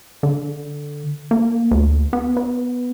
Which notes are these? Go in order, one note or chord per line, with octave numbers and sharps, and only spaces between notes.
D3
A#3
D2
B3
B3